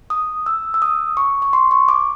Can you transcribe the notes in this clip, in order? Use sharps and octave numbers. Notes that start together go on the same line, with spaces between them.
D#6
E6
E6
D#6
C#6
C#6
C6
C#6
D6